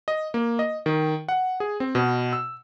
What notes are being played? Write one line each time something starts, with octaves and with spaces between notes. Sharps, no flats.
D#5
A#3
D#5
D#3
F#5
G#4
C4
B2
E6